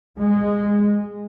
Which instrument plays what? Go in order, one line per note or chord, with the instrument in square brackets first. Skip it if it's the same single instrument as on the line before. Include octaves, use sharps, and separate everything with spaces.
[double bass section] G#3